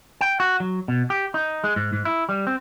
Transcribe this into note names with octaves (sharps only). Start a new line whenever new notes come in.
G5
F#4
F#3
B2
G4
D#4
G#3
G#2
G#2
E4
G3
C4